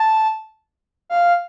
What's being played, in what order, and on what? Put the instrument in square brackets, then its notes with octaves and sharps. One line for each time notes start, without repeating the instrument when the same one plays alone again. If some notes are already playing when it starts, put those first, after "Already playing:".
Already playing: [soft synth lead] A5
F5